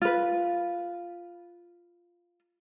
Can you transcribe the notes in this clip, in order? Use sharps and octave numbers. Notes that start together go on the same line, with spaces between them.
F4 B4